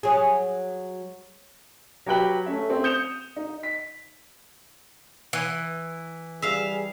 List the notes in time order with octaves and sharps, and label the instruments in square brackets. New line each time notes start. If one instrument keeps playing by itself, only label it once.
[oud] F#3 G#4
[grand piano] F#3 G4 B4 G5 F#6 F#7
A3 C#4 E5
C4
D#6 G6 C#7 E7 F7
D#4
B6
[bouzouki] E3
[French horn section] G3 G#4 [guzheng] E5 F5